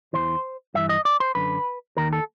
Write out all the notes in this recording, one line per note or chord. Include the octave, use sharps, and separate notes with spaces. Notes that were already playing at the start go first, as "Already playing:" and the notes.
E2 C3 E3 C5
G2 E3 E5
D#5
D5
C5
F#2 D3 B4
D#2 D#3 A#4
A4